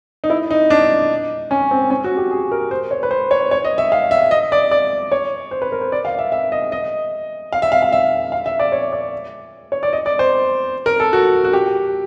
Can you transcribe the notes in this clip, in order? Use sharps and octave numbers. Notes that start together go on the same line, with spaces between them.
D#4
E4
D#4
D4
C#4
C4
C#4
F#4
G4
G#4
A#4
C5
C#5
B4
C5
C#5
C#5
D#5
E5
F5
E5
D#5
D5
D5
C#5
C5
B4
A#4
C5
D5
F5
E5
E5
D#5
D#5
F5
E5
F5
F5
E5
F5
E5
D5
C#5
D5
C#5
D5
D#5
D5
C5
A#4
A4
F#4
F#4
G4